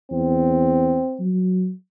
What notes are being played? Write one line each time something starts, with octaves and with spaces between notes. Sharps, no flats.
E2 C4
F#3